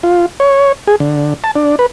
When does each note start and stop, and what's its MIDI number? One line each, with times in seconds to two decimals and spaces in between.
0.03 0.26 65
0.40 0.72 73
0.88 0.96 68
1.00 1.34 50
1.44 1.51 81
1.56 1.76 62
1.79 1.86 71